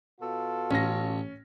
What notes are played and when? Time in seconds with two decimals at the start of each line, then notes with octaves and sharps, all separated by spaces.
0.21 B2 F4 A4
0.71 A1 C#4 A#6